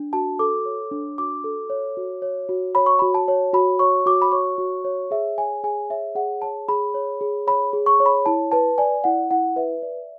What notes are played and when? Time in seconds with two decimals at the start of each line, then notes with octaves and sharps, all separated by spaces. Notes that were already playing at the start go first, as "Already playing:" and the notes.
Already playing: D4
0.13 F#4 A5
0.39 A4 D6
0.65 C#5
0.92 D4
1.18 F#4 D6
1.44 A4
1.70 C#5
1.97 F#4
2.22 C#5
2.49 F#4
2.75 C#5 B5
2.86 C#6
2.99 F#4 B5
3.14 A5
3.28 C#5
3.53 F#4 B5
3.79 C#5 C#6
4.06 F#4 D6
4.22 B5
4.32 C#5 C#6
4.58 F#4
4.85 C#5
5.11 G#4 E5
5.38 C#5 G#5
5.64 G#4 G#5
5.90 C#5 E5
6.15 G#4 F#5
6.42 C#5 A5
6.69 G#4 B5
6.94 C#5
7.21 G#4
7.47 C#5 B5
7.73 G#4
7.86 C#6
8.00 C#5
8.06 B5
8.26 E4 A5
8.52 B4 A5
8.78 D5 G#5
9.04 E4 F#5
9.31 E4 F#5
9.56 B4 E5
9.83 D5